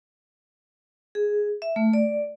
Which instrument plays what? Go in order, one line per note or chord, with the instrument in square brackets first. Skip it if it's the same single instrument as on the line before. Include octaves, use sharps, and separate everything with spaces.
[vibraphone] G#4
E5
A3
D5